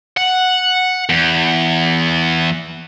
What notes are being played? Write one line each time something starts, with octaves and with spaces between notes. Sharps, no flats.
F#5
E2